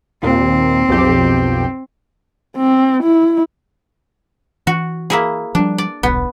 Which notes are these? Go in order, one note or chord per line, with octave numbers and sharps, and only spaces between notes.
D#2 A#2 C4
B1 F2 G4
C4
E4
E3 F#4
A#3 E4 G#4
F3 G3 D4
D5
D#1 B1 B3